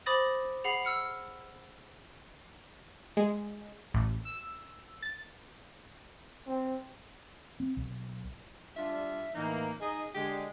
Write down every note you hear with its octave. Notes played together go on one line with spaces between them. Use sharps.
C5 B5 D6 D#6 A6 A#6
G#4 F#5 B5 C7 F7
E6 F6 C#7
G#3
A1
E6
A6
C4
C4
B1
G3 D4 F4 E5
A2 E3 A#3 D#4
D#4 G#4 D#5
D3 G#3 G4